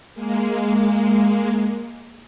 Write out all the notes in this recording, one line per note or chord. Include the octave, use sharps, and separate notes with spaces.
G#3 A#3